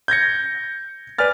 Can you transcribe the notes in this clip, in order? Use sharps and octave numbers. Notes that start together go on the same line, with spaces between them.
G6 G#6 A#6 C#7
B4 D5 G#5 F6 A6